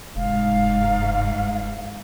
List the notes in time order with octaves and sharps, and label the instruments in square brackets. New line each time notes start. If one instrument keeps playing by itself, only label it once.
[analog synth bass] F1 [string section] G#2 [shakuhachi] F5